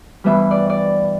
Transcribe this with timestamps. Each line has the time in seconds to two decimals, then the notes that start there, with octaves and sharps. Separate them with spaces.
0.24 G2 E3 G3 B3 E5
0.51 D5
0.69 D5